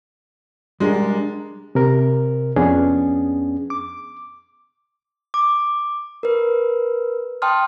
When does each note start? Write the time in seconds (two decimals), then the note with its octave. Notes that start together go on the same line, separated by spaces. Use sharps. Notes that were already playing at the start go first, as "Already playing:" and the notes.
0.80 G3 G#3 D4 A#4
1.75 C3 A#4
2.56 F2 B3 C#4 D4 G#4
3.70 D6
5.34 D6
6.23 A#4 B4
7.42 G5 A5 C6 D#6 F6